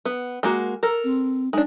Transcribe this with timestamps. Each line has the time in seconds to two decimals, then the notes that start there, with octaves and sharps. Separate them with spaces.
0.05 B3
0.43 G#3 A#3 F#4
0.83 A4 A#4
1.04 C4
1.53 G#3 D4 D#4